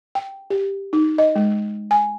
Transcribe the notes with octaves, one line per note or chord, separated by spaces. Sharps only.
G5
G4
D#4
D#5
G#3
G#5